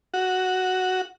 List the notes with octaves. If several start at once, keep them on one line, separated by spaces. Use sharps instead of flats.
F#4